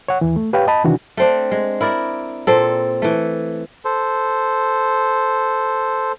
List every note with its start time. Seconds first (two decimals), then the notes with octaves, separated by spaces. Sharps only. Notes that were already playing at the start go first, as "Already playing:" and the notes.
0.08 C#5 F#5
0.21 D#2 E3
0.36 A3
0.53 G4 B4 C#5 F5 G5
0.67 D#5 A5 B5
0.85 C3 D#3 E3 D4 F#4
1.17 A3 C4 D4
1.51 G#3
1.81 E4 A#4 D5
2.47 A#2 C4 A4
3.02 E3 A3
3.85 A4 C5